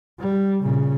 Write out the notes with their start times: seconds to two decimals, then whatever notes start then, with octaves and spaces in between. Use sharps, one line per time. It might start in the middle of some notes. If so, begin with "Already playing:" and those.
0.20 G3
0.62 A#2 C#3